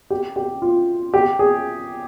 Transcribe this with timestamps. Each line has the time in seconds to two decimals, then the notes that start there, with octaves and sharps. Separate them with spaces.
0.10 G4
0.36 G4
0.62 F4
1.14 G4
1.39 G#4